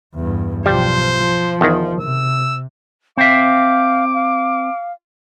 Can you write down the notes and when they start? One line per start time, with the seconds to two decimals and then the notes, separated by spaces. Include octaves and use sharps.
0.15 E2 G2
0.66 B1 F3 G3 C5
1.17 F3
1.61 E2 D#3
2.01 C3 E6
3.17 C4 E5 F5 D6
4.14 F5